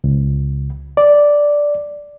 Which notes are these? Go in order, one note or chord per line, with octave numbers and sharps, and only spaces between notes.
C#2
D5